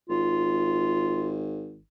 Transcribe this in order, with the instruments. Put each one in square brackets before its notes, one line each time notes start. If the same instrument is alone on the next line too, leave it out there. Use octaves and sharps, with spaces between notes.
[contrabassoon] G#1 [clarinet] F4